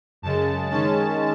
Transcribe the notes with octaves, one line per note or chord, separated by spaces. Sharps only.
F#2 C#3 G#3 A5
D#3 G#3 C#4 A5